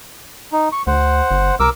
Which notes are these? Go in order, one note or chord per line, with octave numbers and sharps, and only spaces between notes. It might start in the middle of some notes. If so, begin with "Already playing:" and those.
D#4
C#6
D2 C5 F#5
G1
C2 A#4 D6 E6